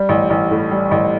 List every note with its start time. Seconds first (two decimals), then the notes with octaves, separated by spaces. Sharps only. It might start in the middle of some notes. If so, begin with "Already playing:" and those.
Already playing: G3
0.09 A1
0.30 A1
0.51 A2
0.71 G3
0.91 A1